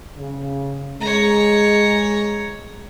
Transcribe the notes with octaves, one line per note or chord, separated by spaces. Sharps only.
C#3
G#3 C#5 A#5